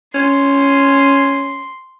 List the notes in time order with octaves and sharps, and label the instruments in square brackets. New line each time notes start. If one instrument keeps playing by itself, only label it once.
[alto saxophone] C#4 [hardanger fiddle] C6